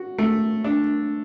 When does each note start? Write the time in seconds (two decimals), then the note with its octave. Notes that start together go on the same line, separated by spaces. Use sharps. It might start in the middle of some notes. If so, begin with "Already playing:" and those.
Already playing: F#4
0.18 A3
0.64 D4